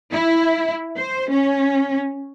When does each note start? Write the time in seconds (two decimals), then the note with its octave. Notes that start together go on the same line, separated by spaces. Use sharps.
0.12 E4
0.96 C5
1.31 C#4